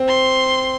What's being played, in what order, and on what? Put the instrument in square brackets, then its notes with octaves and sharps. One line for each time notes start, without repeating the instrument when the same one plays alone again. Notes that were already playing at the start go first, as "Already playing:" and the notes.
Already playing: [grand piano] C4
[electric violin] C6